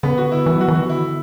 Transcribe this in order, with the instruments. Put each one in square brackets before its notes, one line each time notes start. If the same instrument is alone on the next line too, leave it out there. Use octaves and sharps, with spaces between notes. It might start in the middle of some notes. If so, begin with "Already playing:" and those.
[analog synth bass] D3 [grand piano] B3
[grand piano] F#4
E4
[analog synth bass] E3 [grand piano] E4
[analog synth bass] F#3
[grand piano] F#4
[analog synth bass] E3
[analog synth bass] D3 [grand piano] F#4
[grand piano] E4